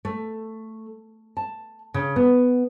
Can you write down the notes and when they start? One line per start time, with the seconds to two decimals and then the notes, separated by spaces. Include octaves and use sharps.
0.05 A3
1.37 A5
1.94 C#3
2.16 B3